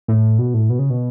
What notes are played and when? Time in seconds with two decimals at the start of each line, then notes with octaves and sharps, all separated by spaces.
0.08 A2
0.38 B2
0.54 A2
0.70 B2
0.79 C#3
0.90 B2